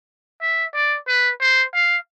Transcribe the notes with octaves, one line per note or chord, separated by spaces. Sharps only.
E5
D5
B4
C5
F5